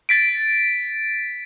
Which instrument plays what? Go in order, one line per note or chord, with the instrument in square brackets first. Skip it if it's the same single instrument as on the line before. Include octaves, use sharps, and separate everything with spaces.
[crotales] A6 B6 D7